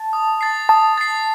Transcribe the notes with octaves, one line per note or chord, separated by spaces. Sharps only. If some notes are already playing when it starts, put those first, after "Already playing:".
Already playing: A5
D#6
A6 C7
A5 D#6
A6 C7